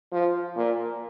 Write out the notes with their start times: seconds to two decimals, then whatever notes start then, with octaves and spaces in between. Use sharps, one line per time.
0.12 F3
0.57 A#2